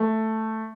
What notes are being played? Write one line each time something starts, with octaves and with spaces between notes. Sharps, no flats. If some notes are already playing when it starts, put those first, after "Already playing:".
Already playing: A3